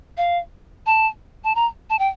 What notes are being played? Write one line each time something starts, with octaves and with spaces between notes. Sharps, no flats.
F5
A5
A5
A#5
A5
G5